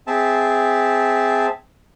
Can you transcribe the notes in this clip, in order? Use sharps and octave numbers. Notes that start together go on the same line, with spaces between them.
C4 G#4 E5 A5